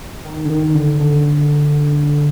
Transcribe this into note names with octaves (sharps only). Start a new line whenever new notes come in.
D#3
D3
D#3
D3
D3